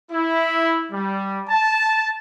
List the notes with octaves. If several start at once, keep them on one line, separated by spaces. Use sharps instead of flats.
E4
G3
A5